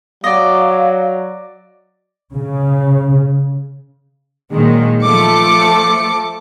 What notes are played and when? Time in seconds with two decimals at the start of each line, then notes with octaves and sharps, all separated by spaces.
0.24 F#3 D5 D#5 F5
2.34 C#3
4.52 A#2 D#3 F#3 G#3
5.04 F3 A3 A4 D6 C#7